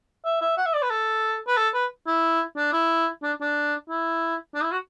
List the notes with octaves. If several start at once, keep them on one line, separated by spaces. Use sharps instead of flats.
E5
E5
F#5
E5
D5
B4
A4
B4
A4
B4
E4
D4
E4
D4
D4
E4
D4
E4
F#4